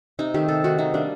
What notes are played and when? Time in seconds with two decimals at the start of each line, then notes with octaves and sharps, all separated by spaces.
0.19 C3 D#4
0.34 D#3 A3 G4
0.48 C3 A4
0.64 D#3 A3 F#4
0.79 D#3 D#4
0.94 G3 A#3 D4